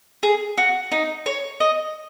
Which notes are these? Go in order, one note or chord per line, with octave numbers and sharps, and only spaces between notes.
G#4
F#4
D#4
C#5
D#5